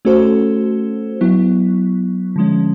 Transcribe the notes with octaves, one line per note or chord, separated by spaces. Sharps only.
A3 C#4 F#4 A4 C5
F#3 B3 E4
D3 F3 G#3 C#4